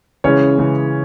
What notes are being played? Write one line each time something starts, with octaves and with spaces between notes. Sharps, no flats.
C#3 E3 G#3 C#4 C#5
C#3 E3 G#3